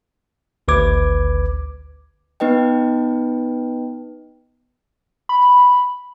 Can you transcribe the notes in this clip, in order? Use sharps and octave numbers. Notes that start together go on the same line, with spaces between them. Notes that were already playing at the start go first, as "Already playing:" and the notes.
G#1 D2 B4 D6 G#6
B3 D#4 B4 D#5 G5
B5